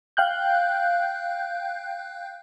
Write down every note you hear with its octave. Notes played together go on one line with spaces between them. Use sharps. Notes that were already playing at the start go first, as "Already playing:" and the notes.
F5 G5 F#6 G6